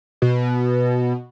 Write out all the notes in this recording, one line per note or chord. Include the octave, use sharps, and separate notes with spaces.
B2